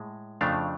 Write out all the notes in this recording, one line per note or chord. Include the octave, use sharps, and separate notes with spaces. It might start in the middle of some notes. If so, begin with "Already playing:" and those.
Already playing: A2 G#3
F2 C#3 F3 A3 D4 F5